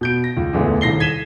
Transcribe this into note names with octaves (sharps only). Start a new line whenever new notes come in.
B2 G6 D7
A#6
C#2
D1 E2 A2 D3 E3 G#3
D#1 C2 A#6 C7 G7
G#6 B6 D#7 E7 G7